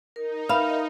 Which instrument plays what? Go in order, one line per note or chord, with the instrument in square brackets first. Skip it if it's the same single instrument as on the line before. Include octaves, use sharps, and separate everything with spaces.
[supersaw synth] D#4 [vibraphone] A#4
[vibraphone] A#4 E5 [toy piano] B4 B5 [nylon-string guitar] F5